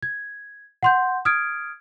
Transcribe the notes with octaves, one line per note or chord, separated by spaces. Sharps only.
G#6
F#5 C6 G6
D#6 F6 G#6 D7